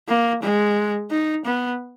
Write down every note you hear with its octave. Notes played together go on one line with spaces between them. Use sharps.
A#3
G#3
D#4
B3